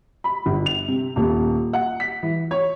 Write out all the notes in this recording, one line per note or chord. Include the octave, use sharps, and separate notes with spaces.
B5
G1
F7
C3
D#1
F#5
B6
E3
C#5